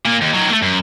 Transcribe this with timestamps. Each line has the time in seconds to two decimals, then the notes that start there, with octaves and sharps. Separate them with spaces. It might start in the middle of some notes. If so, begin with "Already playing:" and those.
0.06 A#2 A#3
0.22 D#2
0.34 D#3 F#3
0.50 A3 A#3
0.63 F#2